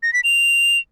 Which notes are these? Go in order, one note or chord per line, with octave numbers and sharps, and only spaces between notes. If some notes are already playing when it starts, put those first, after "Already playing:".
A#6
B6
F7